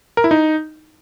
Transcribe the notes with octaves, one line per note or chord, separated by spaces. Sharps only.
A#4
E4
D#4